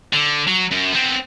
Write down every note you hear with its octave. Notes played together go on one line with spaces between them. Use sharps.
D3
F#3
F#2
B3 C4